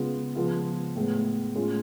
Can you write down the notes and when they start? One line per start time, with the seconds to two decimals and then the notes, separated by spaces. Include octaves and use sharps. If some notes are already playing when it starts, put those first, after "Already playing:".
Already playing: C#3 G#3 B3 F4
0.35 C#3 F3 G#3 B3 F4
0.96 A2 G#3 B3
1.56 A2 G#3 C#4 F4